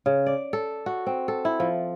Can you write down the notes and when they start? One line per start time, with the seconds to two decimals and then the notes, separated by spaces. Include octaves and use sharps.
0.06 C#3
0.26 D5
0.53 A4
0.86 F#4
1.07 C4
1.28 A4
1.45 E4
1.60 F3